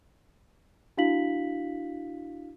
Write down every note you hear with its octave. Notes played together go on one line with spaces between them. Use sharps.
D4 E4 F#4 F5 B6 F#7